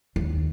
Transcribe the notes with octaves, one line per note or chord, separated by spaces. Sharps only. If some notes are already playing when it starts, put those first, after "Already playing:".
D#2